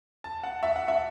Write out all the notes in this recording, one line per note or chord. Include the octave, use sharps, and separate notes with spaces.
A5
F#5
E5
F#5
E5